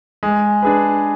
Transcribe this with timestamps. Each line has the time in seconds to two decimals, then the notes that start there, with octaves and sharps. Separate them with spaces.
0.23 G#3
0.62 D4 G#4 B4